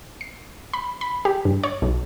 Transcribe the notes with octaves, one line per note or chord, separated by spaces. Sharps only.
C7
B5
B5
G4
G2
C#5
B1